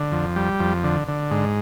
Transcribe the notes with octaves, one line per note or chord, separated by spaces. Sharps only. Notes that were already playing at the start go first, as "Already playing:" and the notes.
Already playing: D3
F2
G3
F2
D3
D3
G#2